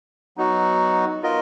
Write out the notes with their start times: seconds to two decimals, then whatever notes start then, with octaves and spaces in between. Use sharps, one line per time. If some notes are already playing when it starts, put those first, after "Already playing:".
0.37 F#3 B3 D#4 F#4
1.22 B3 F4 A#4 D#5